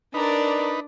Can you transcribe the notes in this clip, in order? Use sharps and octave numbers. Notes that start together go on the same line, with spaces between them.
D4 D#4 A#4 B4 D5 A#5